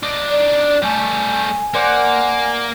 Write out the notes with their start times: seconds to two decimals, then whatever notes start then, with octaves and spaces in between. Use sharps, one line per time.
0.03 D4 D#4
0.30 D5
0.82 G3 A3 G#5
1.74 A#3 C5 D5 F#5